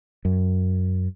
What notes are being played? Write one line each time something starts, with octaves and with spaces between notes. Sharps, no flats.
F#2